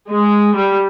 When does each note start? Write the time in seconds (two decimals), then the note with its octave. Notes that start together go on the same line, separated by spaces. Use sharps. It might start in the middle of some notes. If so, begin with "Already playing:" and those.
0.10 G#3
0.55 G3